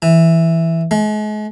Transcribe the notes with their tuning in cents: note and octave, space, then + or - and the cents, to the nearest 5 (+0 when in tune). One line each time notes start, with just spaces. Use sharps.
E3 +0
G#3 +40